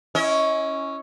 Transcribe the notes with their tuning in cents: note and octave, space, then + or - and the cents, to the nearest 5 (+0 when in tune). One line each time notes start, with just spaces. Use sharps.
C#4 +0 E4 +0 D#5 +35